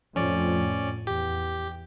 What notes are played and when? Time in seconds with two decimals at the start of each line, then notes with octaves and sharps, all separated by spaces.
0.16 F2 A2 C#4 D5
1.07 E2 G4